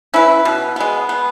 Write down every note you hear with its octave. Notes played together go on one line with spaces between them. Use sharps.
C#4 E4 B4
B2
G#3 B3
B3